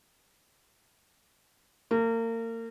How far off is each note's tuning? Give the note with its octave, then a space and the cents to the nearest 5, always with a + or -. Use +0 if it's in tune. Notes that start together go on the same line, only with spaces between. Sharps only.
A#3 -35